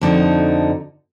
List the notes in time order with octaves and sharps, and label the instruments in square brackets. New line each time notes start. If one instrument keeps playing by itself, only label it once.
[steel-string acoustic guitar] F2 D3 D#4 F#4